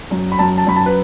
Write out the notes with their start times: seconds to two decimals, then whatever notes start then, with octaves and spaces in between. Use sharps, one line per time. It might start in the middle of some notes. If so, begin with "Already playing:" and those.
0.11 F#2
0.32 B5
0.39 F#2 A5
0.58 A5
0.67 F#2 B5
0.76 A5
0.86 B4